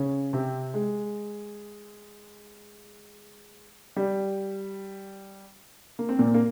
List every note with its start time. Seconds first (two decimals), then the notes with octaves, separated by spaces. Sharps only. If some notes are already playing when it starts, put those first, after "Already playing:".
Already playing: C#3 C#4
0.33 C3 C4
0.74 G#3
3.96 G3
5.99 A#3
6.09 C4
6.19 A#2 A#3
6.34 A#3